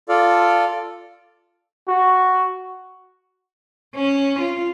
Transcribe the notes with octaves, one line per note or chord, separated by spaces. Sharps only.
F4 A4 D5 F5
F#4
C#4
F4